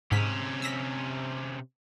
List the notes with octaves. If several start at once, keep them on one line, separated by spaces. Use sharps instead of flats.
G#2 C3 C#4 B6
E6 A#6 B6